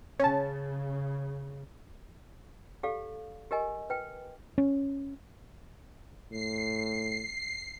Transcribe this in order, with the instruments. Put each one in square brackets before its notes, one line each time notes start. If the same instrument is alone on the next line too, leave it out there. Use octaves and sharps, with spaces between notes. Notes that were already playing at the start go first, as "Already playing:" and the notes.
[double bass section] C#3 [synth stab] C#4 A5
[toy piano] G4 A4 D5 F5
G4 A#4 D#5 G#5
B4 G5
[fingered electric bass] C#4
[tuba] A2 [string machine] C7